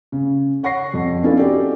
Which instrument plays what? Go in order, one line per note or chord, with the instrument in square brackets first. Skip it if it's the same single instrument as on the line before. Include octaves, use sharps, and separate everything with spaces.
[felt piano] C#3
C#5 F#5 C#6 A#6 C7
F2
B3 C#4 D4 E4 F4 A4
C#4 D#4 F#4 G4 A4 D5